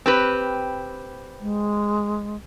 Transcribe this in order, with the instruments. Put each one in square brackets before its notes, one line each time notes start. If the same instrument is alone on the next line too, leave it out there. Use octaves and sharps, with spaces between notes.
[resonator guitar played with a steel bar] C4 G4 B4
[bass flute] G#3